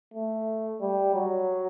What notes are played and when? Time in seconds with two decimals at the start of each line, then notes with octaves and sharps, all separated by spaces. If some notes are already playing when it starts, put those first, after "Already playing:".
0.14 A3
0.80 G3
1.14 F#3